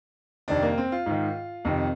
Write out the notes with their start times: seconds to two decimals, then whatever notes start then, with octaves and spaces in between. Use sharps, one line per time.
0.48 F2 C3 D#3 D4
0.62 A#3
0.78 C4
0.92 F4
1.06 G#2 D#3
1.65 F2 C3 D#3